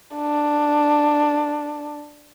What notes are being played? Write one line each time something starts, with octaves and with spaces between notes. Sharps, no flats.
D4